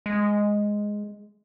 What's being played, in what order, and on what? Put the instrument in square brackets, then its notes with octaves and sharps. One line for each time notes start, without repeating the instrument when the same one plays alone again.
[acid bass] G#3